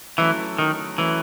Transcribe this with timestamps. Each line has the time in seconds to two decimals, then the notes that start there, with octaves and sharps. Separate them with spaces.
0.18 E3 F#3 A3 C#4 E4
0.59 D#3
0.98 E3 F#3 A3 C#4 E4